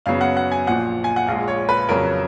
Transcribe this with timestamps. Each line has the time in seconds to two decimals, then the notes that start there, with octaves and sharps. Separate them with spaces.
0.06 F#2 C#3 F#3 B3 F5
0.21 F#5
0.37 F#5
0.52 G#5
0.67 A#1 A#2 F3 F#5
1.04 G#5
1.16 F#5
1.27 A#1 A#2 G#3 F5
1.48 C#5
1.69 B4
1.89 F2 C#3 F#3 C#4 A#4